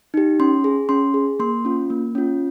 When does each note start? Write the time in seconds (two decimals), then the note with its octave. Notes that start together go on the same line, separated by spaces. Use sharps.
0.14 D#4 G4
0.40 C#4 C6
0.64 G#4
0.89 C#4 C6
1.14 G#4
1.39 A#3 C6
1.65 C#4 F4
1.90 A#3
2.15 C#4 F4